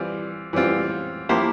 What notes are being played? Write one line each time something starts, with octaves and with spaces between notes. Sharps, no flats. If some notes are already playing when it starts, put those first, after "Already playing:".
Already playing: E3 G3 C4 F4
E3 G3 C4 F4
F3 A#3 E4 G4 C5